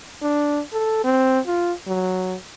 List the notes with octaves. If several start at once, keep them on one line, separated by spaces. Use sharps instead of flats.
D4
A4
C4
F4
F#3